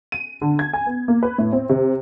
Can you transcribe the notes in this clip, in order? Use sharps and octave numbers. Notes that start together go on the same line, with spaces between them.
D#7
D3
G#6
G#5
B3
A#3
B4
A2
C4
C3